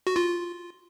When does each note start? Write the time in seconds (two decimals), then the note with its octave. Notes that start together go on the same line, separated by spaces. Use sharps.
0.07 F#4
0.16 F4